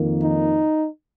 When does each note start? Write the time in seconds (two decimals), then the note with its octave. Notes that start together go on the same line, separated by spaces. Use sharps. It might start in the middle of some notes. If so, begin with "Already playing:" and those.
Already playing: F2 D#3 A#3
0.22 D#4